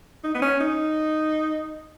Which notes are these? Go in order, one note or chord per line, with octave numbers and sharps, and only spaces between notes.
D#4
B3
C#4
D#4